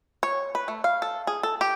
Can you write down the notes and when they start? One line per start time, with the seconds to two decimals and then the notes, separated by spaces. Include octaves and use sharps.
0.23 C#5
0.55 B4
0.68 A3
0.84 F5
1.02 A4
1.27 G#4
1.43 A4
1.61 G4